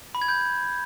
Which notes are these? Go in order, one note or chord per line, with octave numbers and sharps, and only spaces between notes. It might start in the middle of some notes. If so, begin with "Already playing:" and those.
B5
G#6
G6